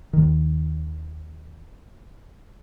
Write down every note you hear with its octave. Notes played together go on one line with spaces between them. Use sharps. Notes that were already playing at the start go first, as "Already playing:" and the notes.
D#2 D#3